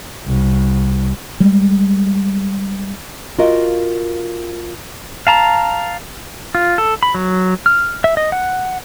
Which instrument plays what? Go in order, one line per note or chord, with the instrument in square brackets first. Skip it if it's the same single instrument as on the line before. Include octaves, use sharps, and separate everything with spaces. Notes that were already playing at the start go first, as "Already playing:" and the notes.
[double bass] C2
[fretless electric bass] G3 G#3
[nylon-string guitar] F4 F#4 A#4 D#5 F5
[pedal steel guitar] F5 A5 A#5
F4
A4
B5
F#3
F6
E5
D#5
F#5